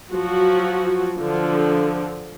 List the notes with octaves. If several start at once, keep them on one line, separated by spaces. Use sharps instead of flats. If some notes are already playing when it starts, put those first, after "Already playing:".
F3 F#3 F#4
D3 F3